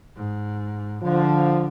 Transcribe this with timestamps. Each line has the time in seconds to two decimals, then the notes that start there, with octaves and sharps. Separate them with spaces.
0.16 G#2
1.03 D3 F3